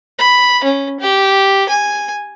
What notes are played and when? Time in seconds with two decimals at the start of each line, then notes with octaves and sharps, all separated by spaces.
0.19 B5
0.64 C#4
1.00 G4
1.69 G#5